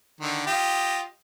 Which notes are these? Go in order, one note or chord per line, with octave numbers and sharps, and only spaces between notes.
D3 D#3
F4 G4 D#5